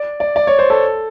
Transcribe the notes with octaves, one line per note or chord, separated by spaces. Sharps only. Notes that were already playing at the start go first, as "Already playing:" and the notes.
Already playing: D5
D5
D5
C#5
C5
A4